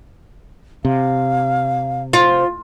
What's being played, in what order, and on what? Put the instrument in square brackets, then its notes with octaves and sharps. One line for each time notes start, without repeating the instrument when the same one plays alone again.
[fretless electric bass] C3 [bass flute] F5
[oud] F4 [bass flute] C5